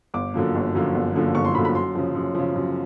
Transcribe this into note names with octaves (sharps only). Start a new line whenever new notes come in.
G1 D6
F#2 D3 F3 A#3
G1
F#2 D3 F3 A#3
G1
F#2 D3 F3 A#3
G1 C#6
C6
F#2 D3 F3 A#3 B5
B5
F#2 C6
C#3 F3
F#2
C#3 F3
F#2